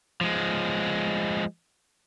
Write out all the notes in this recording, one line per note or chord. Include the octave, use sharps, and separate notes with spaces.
F3 G#3